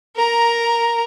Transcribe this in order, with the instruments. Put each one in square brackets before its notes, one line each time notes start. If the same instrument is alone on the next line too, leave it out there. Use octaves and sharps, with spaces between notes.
[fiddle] A#4 A#5